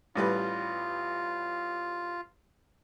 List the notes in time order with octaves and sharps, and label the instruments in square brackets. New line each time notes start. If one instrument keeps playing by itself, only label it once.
[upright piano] A1 G3 B4 [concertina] F4